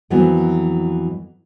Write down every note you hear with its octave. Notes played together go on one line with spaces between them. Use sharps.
F2 E3 F#3 A#3 B3